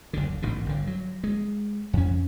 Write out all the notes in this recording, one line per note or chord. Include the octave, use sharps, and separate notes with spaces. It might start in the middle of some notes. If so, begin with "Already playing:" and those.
F#1 D2 D3
A1 G#2 B2 D#3
G1 D3
F#3
G#3
F2 F3 C#4